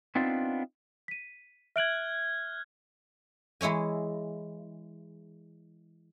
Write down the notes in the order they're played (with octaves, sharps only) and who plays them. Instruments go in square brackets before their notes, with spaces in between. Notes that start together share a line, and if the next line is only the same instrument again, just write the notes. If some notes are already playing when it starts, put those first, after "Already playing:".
[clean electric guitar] B3 C4 D4 D#4 F4
[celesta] B6 D#7
[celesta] E5 D7 F#7 [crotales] F6 F#6 G#6
[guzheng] E3 G#3 E4 C#5 G#5